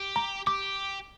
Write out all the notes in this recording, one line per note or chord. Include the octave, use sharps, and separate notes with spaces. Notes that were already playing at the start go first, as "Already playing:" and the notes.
Already playing: G4
A#5
G4 D6